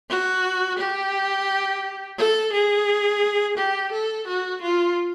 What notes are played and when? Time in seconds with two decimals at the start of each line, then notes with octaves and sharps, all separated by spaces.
0.10 F#4
0.80 G4
2.19 A4
2.53 G#4
3.58 G4
3.92 A4
4.27 F#4
4.62 F4